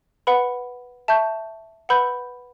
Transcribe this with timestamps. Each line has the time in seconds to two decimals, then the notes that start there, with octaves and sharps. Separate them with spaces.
0.27 B4 F#5 B5
1.08 E5 A5 C#6 G6
1.89 B4 F#5 B5 E6 G6